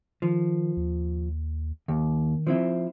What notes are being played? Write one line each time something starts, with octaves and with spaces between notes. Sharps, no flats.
D#3 F3
D#2
D#2 D#3
F3 C4 E4